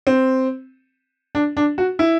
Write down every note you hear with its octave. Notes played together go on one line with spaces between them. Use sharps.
C4
D4
D4
F#4
E4